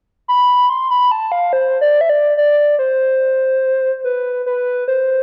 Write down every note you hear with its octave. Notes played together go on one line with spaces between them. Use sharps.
B5
C6
B5
A5
F5
C5
D5
E5
D5
D5
C5
B4
B4
C5